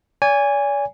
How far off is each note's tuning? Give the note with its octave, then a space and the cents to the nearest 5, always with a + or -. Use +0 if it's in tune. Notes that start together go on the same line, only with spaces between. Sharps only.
D5 -45 G#5 -15